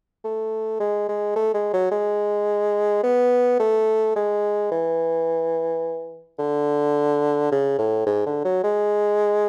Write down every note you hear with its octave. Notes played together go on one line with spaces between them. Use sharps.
A3
G#3
G#3
A3
G#3
F#3
G#3
B3
A3
G#3
E3
D3
C#3
A2
G#2
D3
F#3
G#3